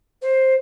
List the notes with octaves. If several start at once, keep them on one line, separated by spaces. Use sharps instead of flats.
C5